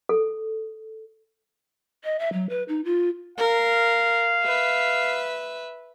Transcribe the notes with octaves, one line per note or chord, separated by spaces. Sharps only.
A4
D#5
E5
F#3
B4
D#4
F4
A#4 F5
B4 E5